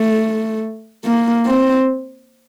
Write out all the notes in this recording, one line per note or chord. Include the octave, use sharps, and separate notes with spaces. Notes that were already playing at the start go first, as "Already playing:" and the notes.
Already playing: A3
A#3
C4